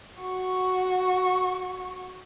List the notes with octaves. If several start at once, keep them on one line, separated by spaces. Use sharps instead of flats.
F#4 C#6